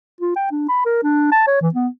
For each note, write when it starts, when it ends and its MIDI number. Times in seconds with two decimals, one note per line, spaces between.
0.21 0.36 65
0.36 0.51 79
0.52 0.65 62
0.69 0.83 83
0.86 1.03 70
1.04 1.32 62
1.32 1.42 81
1.47 1.60 73
1.61 1.69 52
1.74 1.88 59